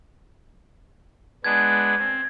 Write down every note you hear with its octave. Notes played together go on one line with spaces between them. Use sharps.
G#3 B3 D4 G#6
C4